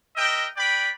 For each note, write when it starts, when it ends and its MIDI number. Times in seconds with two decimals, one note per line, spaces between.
0.16 0.46 70
0.16 0.46 75
0.16 0.46 76
0.16 0.46 79
0.56 0.89 71
0.56 0.89 74
0.56 0.89 79
0.56 0.89 83